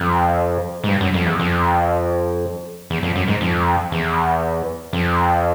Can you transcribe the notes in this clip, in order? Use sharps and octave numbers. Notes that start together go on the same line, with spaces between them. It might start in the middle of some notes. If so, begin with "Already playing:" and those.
Already playing: F2
G#2
G2
F#2
F2
E2
F2
E2
F2
F#2
G#2
F2
E2
F2